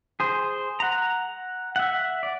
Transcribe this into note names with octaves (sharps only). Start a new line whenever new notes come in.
G#4 C5
F#5 A#5
E5 F#5
D5